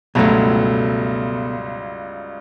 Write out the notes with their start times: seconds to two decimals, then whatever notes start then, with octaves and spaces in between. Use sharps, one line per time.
0.15 C#2 G2 B2 F#3 A3